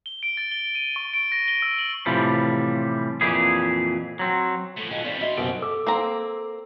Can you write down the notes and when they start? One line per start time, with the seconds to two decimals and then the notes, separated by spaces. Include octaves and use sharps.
0.06 G7
0.23 D7
0.37 A6
0.51 G7
0.75 D#7
0.96 C#6
1.14 D7
1.32 A#6
1.48 G7
1.62 E6
1.79 F#7
2.06 A2 C3 E3 F3 G3
3.21 F2 A#2 E3 G4 G#4
4.19 F#3 C4
4.78 A2 F3 A4
4.91 B2 D#3 C#4 F4 G#4 D#5
5.04 G3 C4 C#4 F4 C5 D5
5.20 D3 G3 F#4 D#5 E5 C6
5.37 F#1 B2 D#4 C5 G#5 D7
5.62 A4 D6 E6
5.87 A#3 C4 A#5